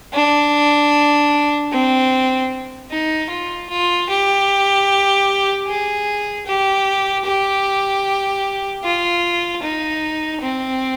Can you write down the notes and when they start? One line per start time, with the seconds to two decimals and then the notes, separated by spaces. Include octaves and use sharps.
0.13 D4
1.71 C4
2.90 D#4
3.30 F4
3.69 F4
4.09 G4
5.67 G#4
6.46 G4
7.25 G4
8.84 F4
9.63 D#4
10.41 C4